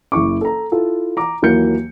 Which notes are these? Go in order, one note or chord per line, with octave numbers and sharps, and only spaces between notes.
F#1 E4 C#6 D6
A4 A#5
E4 F4 A4
A#5 D6
D#2 E3 F#3 A#3 G6 C#7